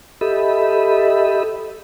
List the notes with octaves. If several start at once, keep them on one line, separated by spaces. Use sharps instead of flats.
G4 A4 D#5 E5 B5